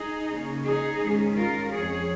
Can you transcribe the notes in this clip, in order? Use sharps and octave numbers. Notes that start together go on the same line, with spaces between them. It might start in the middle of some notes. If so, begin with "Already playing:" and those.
Already playing: D#4 G#4
C#3 A#3 C#4
D#4 G#4
G#2 D#3 G#3 C#4
F4 A#4
F2 F3 C#4 G#4 C#5